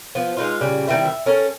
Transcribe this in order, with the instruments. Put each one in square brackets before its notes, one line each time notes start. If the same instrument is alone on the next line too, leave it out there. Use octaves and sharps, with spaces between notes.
[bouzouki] F3 B3
G#3 D#4 F4
A#2 C#3 G3
D#3 G3 C4 E4
E5
C#4 A4 A#4